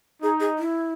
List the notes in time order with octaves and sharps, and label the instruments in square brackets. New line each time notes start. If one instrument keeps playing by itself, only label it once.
[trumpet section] D#4 [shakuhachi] G#4
[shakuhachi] G#4
E4